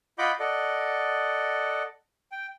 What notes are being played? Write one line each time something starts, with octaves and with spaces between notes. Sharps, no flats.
F4 D#5 F#5 B5 D6 G6
A4 D5 D#5 F#5
G5